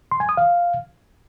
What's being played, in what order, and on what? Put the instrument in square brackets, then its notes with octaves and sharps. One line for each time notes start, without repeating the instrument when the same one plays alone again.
[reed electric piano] C6
G#5
D#6
F5